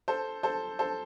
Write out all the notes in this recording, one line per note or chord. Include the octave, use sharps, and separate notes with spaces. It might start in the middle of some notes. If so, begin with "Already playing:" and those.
A4 C5
A4 C5
A4 C5